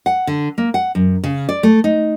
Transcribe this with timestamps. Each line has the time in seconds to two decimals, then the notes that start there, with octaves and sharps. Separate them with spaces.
0.06 F#5
0.27 D3
0.58 A#3
0.74 F#5
0.95 F#2
1.24 C#3
1.49 D5
1.63 A3
1.84 D#4